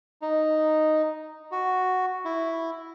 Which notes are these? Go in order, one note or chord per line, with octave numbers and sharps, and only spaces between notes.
D#4
F#4
E4